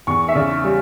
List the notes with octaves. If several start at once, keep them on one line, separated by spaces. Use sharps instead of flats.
E2 C#6
E5
C#3 D5
G3